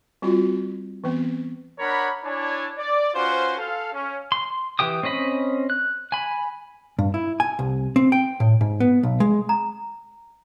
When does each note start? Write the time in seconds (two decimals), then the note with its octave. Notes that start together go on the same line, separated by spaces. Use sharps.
0.22 G3 C4 F4 F#4
1.04 E3 B3 C4
1.79 D4 A#4 C#5 F#5 B5
2.24 D4 E4 C#5 D5 G#5 A5
2.78 D5
3.14 C#4 F4 F#4 B4 C5
3.58 A4 F5
3.93 C#4
4.32 C6
4.79 E3 G4 G5 D#6
5.03 C4 C#4 D#5 B5
5.70 F#6
6.12 G#5 B5
6.99 G2
7.14 E4
7.40 G#5
7.59 C2
7.96 C4
8.12 G5
8.40 A2
8.61 G#2
8.80 B3
9.03 B1
9.20 G#3
9.49 A#5